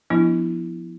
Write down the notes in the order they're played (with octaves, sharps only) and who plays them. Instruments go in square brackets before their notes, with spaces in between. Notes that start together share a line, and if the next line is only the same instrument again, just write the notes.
[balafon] F3 B3 D4 E4